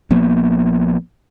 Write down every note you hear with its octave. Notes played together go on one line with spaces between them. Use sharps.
A#1 F3 A#3 B3